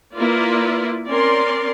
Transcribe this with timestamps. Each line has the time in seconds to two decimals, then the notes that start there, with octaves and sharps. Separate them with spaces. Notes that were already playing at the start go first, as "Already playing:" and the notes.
0.14 A#3 E4 F4 B4 D5
1.08 C4 C#4 A#4 D5 C6